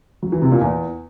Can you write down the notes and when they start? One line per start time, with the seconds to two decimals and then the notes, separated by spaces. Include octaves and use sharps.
0.23 F#3
0.32 E3
0.42 C3
0.52 A#2
0.61 E2